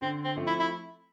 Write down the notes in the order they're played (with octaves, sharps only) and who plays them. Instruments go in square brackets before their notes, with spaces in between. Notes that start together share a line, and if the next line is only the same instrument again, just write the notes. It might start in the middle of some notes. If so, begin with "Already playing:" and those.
[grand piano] D3 [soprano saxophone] C4
[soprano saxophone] C4
[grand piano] F3 A3 C4
[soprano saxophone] E4
E4